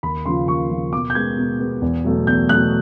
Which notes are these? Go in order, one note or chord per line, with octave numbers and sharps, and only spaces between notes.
D#2 B5
C#3 F3 C6
D#2 C#6
C#3 F3
B2 D6
G6
G#3 B3 G#6
B2
G#3 B3
E2
B2 F#3 A3
E2 G6
B2 F#3 A3 F#6